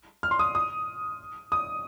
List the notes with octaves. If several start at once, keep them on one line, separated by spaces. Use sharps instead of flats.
F6
C6
D#6
D#6
D#6